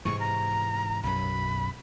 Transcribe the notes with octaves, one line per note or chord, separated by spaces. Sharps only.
G#2 C3 E3 C#6
A#5
B1 F#2 B5